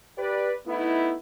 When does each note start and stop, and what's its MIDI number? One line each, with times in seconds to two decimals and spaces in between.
0.18 0.53 67
0.18 0.53 71
0.18 0.53 74
0.67 1.15 57
0.67 1.15 59
0.67 1.15 63
0.67 1.15 64